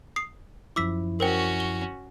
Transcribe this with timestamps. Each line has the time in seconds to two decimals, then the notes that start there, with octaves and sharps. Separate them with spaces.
0.16 D#6 C7
0.76 F#2 F3 E4 D6 E6 B6
1.20 C#4 F#4 A#4 C5 G5
1.60 G7